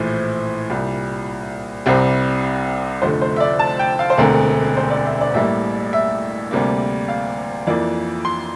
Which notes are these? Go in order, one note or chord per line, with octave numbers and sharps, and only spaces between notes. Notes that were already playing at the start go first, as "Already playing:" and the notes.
Already playing: A#1 A2 E3 C5
C2 A#2 G3
C2 C3 G3 C4
F1 F2 D3 A3 C5
C5
E5
D5
A5
G5
F5
C5
E1 D2 D3 A3 C4 A#4
C5
D5
E5
D5
A1 A2 G3 A#3 E5
E5
D2 C3 G3 A#3
F5
F2 E3 A#3 D5
C6